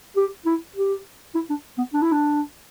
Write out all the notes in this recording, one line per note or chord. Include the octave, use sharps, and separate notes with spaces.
G4
E4
G4
E4
D4
B3
D4
E4
D4